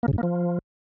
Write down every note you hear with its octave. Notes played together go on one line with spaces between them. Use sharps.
A#3
C#3
G2
A#3
F3